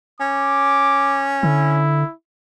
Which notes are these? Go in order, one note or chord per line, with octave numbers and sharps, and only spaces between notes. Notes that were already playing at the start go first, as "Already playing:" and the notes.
C#4 D6
D3 E4